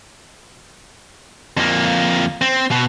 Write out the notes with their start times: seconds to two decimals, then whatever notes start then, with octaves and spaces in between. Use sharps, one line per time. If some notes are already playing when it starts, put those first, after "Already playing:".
1.57 F2 A#3
2.42 C4
2.71 B2